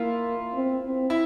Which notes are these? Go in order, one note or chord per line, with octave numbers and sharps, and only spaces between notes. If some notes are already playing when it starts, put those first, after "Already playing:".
Already playing: A#3 E4 F4
C4
C4
E4